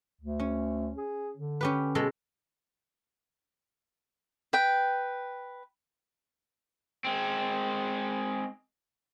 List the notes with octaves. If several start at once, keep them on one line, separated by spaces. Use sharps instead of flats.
D2
C#4
G#4
D3
C#4 G4 B4
B2 G#3 A4
B4 G5
G#3 C4